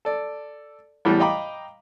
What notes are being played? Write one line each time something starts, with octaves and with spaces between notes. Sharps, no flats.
A4 D5
E2 A2 E3 G3
D#5 F5 G5 A#5 B5 D6